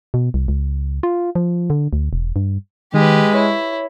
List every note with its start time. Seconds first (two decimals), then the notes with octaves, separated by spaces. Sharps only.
0.14 B2
0.34 C2
0.48 C#2
1.03 F4
1.35 F3
1.70 D3
1.93 D2
2.13 E1
2.36 G2
2.94 D#3 G#3 G4 B4
3.35 E4 C#5